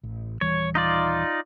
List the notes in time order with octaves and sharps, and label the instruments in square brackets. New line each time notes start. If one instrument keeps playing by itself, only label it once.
[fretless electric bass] A1
[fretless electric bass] D#1 E3 G3 [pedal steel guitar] C#5
[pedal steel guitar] D#4 F4 D5